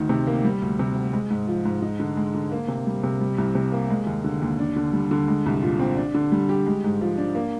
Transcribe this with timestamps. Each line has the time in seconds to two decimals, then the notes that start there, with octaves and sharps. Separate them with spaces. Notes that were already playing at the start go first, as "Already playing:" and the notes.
Already playing: D2 D#3
0.09 C3
0.27 A#3
0.44 G3
0.62 D2
0.79 C3
0.95 D2
1.13 G#3
1.30 G#2
1.47 F3
1.65 G#2
1.82 D#4
2.00 D3
2.17 G#3
2.34 D3
2.52 A#3
2.68 C3
2.87 G3
3.04 C3
3.21 G3
3.38 C2
3.55 C3
3.72 A#3
3.90 G#3
4.07 D#2
4.24 D3
4.42 D#2
4.59 D4
4.76 D3
4.93 G3
5.11 D3
5.28 G#3
5.46 C2
5.62 A#2
5.79 C4
5.97 D4
6.14 D3
6.32 G3
6.49 G4
6.66 G#3
6.84 G#2
7.01 F3
7.18 D4
7.35 A#3